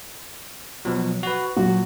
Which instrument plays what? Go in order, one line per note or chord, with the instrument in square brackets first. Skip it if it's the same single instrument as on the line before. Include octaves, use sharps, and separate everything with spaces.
[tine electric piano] B2 F3 F#3
F#4 B4
[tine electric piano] A#2 [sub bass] F#3 [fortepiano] F#4